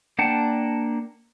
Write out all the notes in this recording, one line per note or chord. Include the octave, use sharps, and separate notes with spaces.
A#3 D4 F#5 G5 A5